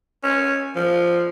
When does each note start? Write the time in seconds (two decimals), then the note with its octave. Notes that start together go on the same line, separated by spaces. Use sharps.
0.23 C#4
0.76 F3